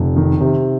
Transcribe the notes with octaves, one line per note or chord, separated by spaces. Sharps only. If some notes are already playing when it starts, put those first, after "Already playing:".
Already playing: F1
D#3
C3